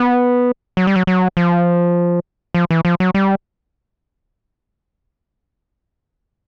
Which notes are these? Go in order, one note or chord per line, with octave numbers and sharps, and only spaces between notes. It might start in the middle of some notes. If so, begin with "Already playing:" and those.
Already playing: B3
F#3
G3
F#3
F#3
F3
F3
E3
F3
F#3
G3